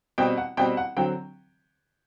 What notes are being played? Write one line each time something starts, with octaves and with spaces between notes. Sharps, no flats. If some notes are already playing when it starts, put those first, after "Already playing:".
B2 G3 C4 G5
F#5
B2 G3 C4 G5
F#5
D3 F#3 C4 G5